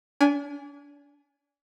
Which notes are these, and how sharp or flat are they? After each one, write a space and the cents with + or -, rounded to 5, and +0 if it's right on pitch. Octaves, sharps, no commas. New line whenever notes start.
D4 -35 G#5 -5